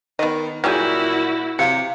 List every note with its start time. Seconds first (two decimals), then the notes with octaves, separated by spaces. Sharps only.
0.19 D#3 B3 D#5
0.64 A#2 F#3 G3 E4 F#4 G#4 F6 G6
1.59 C3 F#3 F5 C#7